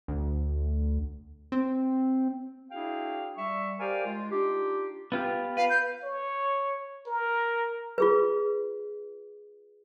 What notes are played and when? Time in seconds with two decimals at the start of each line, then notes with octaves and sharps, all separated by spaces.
0.08 D2
1.52 C4
2.71 D4 E4 F#4 G#4 F5 G5
3.37 G3 E5 C#6
3.80 G4 A#4 C5 D5 F5 G#5
4.05 G#3 F4
4.31 D4 D#4 F4 G4
5.12 B3 F4 G4
5.57 B4 F5
5.70 G6
6.03 C#5
7.07 A#4
7.98 F4 G#4 B4